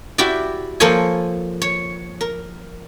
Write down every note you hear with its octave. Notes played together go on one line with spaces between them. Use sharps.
E4 F#4 G4 D5
F3 A#3 A4 C5 C#5 G#5
C#5
A#4